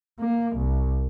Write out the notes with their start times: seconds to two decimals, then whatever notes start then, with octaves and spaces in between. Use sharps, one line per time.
0.20 A#3
0.57 C2